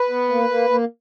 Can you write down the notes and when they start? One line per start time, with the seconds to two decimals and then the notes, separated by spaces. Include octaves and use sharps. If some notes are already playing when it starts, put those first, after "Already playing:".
Already playing: B4
0.09 B3
0.29 A#3
0.49 A#3
0.70 A#3